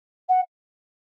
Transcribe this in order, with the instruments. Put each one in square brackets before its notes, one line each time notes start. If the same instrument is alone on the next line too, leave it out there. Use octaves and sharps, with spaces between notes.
[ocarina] F#5